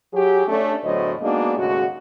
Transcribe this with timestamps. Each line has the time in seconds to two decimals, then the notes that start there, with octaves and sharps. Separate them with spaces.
0.13 F#3 G4 G#4
0.47 A3 C#4 D4
0.84 E2 A2 D3 F#3 C5 D#5
1.22 G#3 A#3 B3 D4 D#4 F#4
1.57 D#2 A2 C#3 G#3 F#4